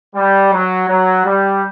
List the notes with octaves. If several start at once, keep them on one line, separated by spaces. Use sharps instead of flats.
G3
F#3
F#3
G3